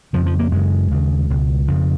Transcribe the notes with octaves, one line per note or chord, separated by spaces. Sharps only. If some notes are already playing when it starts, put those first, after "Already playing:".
F2 C#3 F3
F3
A#3
F#2 C#3 G#3
D#2 C#3
C#2 B2
F2 C#3